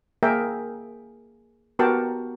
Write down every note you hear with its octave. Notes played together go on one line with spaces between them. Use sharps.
A#3 G#4 A#4 E5 G5
B3 F#4 G4 A#4 G5 A5